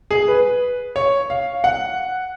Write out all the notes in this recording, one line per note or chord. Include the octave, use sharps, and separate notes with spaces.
G#4
B4
C#5
F5
F#5